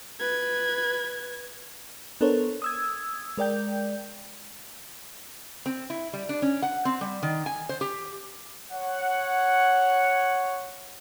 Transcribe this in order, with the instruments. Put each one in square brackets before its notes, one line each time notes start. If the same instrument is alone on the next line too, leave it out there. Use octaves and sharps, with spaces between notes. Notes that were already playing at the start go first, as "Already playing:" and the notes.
[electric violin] B4 G#6
[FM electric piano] B3 D4 A4 A#4 C5 C#5
D#6 E6 G#6
G#3 A#4 D5 G5 G6
[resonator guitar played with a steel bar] C4
E4
G3
D4
C#4
F#5
C4
G3
D#3
G#5
C5
G4
[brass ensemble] C#5 F#5